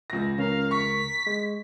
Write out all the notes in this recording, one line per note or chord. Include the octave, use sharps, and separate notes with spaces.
C#2 A#6
C#2 C#4 A#4 F5 A#5
C#6 B6
G#3